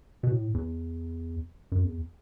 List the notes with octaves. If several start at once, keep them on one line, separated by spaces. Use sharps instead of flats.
B2
A2
E2
F#2
E2